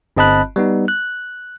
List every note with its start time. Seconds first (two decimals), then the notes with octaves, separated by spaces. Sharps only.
0.17 G1 C4 D#5 A5 B5 F#6
0.56 G3 B3 D#4
0.88 F#6